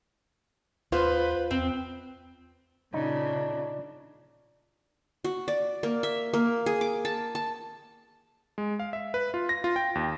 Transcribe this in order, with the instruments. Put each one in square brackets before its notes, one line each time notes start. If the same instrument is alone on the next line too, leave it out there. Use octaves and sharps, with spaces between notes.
[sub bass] D#2 [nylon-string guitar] B3 F4 [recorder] B4 [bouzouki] C5
[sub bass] E2 [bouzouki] C4
[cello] A#2 C#3 [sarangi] D4 [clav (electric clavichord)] D#4
[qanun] F#4
D5
A#3
E5
A#3
G#4
D6
A5
A5
[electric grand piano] G#3
F5
E5
B4
F4
A#6
F4
G5
D#2